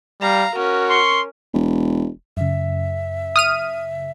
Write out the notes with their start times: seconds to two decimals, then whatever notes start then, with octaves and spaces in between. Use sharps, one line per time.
0.21 G3 F5 A#5
0.55 C#4 F#4 A#4
0.89 C6 C#6
1.54 E1
2.37 F#2 C#3 E5
3.36 D#6 F6 D#7